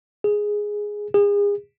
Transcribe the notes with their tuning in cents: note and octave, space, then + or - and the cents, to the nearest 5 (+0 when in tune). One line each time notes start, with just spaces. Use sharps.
G#4 +0
G#4 -35